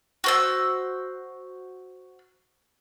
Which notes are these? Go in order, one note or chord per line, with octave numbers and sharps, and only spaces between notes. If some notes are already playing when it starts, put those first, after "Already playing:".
F#4 C5 E6